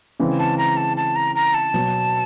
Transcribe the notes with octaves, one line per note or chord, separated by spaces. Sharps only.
C#3 E3 G#3 C4
A5
A#5
A5
A5
A#5
A#5
A5
B2 F#3 B3